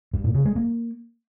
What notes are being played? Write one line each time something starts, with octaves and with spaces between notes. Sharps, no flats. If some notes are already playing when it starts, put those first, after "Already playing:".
G2
A#2
C#3
G#3
A#3